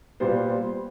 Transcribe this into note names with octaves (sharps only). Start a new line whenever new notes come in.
A#2 G3 B3 C5